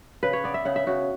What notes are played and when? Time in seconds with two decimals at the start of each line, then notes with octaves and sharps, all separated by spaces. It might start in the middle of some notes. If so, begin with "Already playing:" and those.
0.23 C#3 B4
0.33 C#5
0.44 B3 D5
0.54 E5
0.65 C#3 F#5
0.76 E5
0.87 C#3 F#4